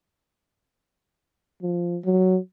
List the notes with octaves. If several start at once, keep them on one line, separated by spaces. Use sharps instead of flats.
F3
F#3